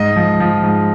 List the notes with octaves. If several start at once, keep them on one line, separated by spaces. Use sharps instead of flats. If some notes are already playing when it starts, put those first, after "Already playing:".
Already playing: G#2 D#5
F3
F3
G#2